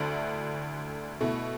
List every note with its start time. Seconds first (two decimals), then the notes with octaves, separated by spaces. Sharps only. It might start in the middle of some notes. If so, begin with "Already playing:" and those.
Already playing: D2 D3 A3 E4
1.21 B2 A3 E4